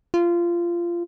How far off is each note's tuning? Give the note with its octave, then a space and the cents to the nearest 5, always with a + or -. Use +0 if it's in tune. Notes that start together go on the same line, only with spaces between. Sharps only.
F4 -20